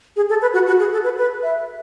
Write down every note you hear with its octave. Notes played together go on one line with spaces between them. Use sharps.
G#4
A4
B4
F#4
F#4
G#4
A4
B4
B4
E5